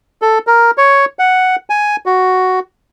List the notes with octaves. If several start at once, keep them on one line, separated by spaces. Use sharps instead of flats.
A4
A#4
C#5
F#5
G#5
F#4